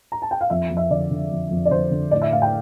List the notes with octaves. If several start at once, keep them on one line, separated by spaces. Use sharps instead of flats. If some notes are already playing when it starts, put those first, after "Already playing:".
A#5
A5
G5
F5
F2 E5
F2
E5
D3 D5
D3
F2
F2
D5
D3 C5
D3
A2 D5
E5
A2 F5
G5